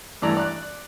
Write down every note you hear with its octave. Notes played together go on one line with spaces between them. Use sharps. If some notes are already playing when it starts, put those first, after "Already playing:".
G2 E3 A3 D5 A#5 E6
D5 F#6